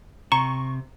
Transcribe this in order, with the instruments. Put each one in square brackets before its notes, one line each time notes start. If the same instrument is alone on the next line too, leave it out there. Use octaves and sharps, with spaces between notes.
[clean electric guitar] C3 [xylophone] A#5 [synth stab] C#6